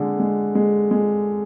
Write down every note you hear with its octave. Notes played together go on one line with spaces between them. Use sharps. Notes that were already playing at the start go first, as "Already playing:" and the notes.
Already playing: D3 G#3
G#3
G#3
G#3